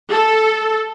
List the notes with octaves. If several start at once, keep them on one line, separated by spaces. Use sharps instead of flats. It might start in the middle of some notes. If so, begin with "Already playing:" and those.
A4